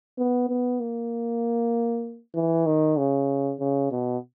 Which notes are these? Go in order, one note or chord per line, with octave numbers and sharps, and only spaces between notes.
B3
B3
A#3
E3
D#3
C#3
C#3
B2